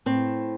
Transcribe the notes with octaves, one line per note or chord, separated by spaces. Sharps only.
A2 C4